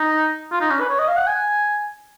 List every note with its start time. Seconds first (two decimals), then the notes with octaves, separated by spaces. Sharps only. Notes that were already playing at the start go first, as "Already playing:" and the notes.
Already playing: D#4
0.51 F4
0.61 D#4
0.70 C#4
0.80 B4
0.89 C#5
0.99 D#5
1.08 F5
1.17 F#5
1.27 G#5